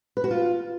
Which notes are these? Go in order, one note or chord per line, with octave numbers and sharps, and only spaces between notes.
B4
F#4
F4